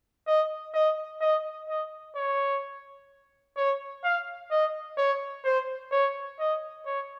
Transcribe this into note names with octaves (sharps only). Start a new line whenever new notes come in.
D#5
D#5
D#5
D#5
C#5
C#5
F5
D#5
C#5
C5
C#5
D#5
C#5